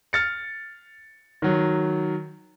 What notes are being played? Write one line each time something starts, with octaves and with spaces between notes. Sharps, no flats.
F6 A6 C#7
D#3 F#3